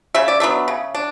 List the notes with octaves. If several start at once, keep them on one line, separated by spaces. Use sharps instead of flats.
C#3 E5
D5
F#3 B3 D4 E5
C#3
D4